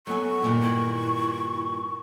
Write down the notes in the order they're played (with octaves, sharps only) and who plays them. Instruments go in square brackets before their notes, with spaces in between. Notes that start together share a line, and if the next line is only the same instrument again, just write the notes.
[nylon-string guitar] F#3 B3 G#5 [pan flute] A4 [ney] C#6
[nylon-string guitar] G2 A#2 D#3
[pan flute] E4